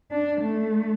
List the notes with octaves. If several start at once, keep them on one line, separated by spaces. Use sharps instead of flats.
D4
A3